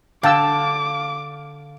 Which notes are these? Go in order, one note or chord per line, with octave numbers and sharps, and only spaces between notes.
D3 F5 G5 A5 D6 E6